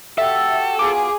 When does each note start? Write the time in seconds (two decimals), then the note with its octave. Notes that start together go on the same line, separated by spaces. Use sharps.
0.18 F#4 G4 A4 E5
0.79 B3 F4 F#4 G#4 D6